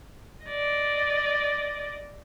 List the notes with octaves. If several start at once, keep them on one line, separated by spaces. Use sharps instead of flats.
D5 D#5